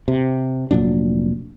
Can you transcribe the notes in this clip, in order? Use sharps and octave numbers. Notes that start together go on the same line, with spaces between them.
C3
F1 A#2 F#3 D4